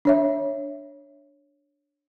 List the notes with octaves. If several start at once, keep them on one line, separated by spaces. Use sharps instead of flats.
D4 C#5 E5